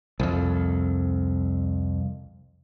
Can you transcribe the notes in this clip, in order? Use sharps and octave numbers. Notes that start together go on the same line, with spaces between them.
C2 F2